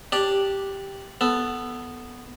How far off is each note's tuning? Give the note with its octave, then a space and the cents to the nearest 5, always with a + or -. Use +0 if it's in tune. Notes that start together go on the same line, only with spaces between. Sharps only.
D4 +0 G4 +0 D5 +0
B3 +0 A4 +0